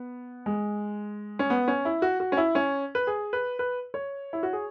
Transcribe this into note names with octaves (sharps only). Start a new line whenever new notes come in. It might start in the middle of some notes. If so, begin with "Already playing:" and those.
Already playing: B3
G#3
C#4
B3
C#4
E4
F#4
F#4
C#4
E4
C#4
B4
G#4
B4
B4
C#5
E4
F#4
G#4